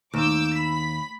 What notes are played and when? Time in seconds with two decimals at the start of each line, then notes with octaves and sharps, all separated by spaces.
0.13 D#2 D6 E6 G6
0.55 B5 B6